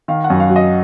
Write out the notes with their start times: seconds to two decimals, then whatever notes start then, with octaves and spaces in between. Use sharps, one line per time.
0.08 D#3 F5
0.24 F#5
0.30 F#2
0.40 F5
0.50 F#3
0.56 D#5